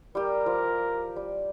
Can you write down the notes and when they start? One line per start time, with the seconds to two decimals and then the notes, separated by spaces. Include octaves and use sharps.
0.15 G3 G4 A#4
0.46 F3 D6
1.16 G3